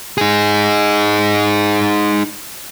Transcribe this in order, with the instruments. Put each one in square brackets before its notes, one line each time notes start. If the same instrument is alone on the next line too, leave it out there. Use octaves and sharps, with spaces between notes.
[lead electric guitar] D#4 G#4